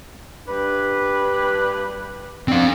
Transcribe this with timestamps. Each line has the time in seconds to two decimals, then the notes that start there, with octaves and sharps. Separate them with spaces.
0.48 G2 D4 B4
2.48 D3 C4 F5